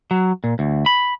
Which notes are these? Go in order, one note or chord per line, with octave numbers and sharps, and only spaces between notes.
F#3
A#2
D2
B5